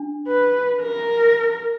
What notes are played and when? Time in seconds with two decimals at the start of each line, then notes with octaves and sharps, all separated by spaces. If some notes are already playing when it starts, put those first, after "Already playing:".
Already playing: D4
0.28 B4
0.82 A#4